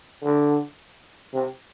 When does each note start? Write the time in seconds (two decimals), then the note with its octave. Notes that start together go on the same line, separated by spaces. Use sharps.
0.22 D3
1.33 C3